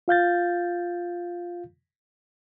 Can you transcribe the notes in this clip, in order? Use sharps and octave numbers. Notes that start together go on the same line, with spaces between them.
F4 F5 G6 A6